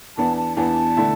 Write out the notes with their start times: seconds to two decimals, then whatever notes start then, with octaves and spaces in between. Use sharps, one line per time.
0.17 E2 E3 B3 D4 A5
0.37 A5
0.57 E2 E3 B3 D4 A5
0.97 D3 A3 E4